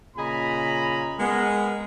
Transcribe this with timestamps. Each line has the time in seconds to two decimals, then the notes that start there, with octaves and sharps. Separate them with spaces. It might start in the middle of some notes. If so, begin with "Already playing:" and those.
0.17 A#2 C#3 D#5 G#5 A#5 B5
1.19 G#3 B3 A#4